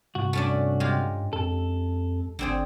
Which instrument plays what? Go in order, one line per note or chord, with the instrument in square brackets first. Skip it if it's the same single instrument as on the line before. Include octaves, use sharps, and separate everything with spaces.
[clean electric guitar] C2 F#4 [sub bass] G2
[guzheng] A3 C#4 D4
G#3 F4 G4
[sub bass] F2 [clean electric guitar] A4
[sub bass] G1 [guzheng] D3 C4 G#4